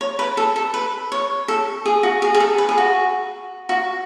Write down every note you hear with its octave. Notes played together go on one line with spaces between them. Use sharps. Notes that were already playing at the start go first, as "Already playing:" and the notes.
C#5
B4
A4
A4
B4
C#5
A4
G#4
F#4
G#4
G#4
A4
B4
G#4
F#4
F#4